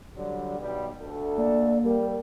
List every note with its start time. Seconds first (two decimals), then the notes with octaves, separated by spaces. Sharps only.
0.16 D3 F#3 G3
0.59 B1 B2 G3
1.01 D2 A4
1.38 A#3 D5
1.84 G3 A#4